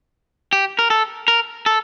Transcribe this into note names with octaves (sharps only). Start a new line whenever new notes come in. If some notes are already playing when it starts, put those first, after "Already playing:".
G4
A#4
A4
A#4
A4